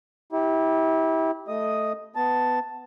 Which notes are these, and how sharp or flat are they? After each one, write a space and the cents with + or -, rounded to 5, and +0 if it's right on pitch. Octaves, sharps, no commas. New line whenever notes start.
E4 -30 G4 +0
A3 +0 D#5 +0 D#6 +0
B3 +15 A5 +0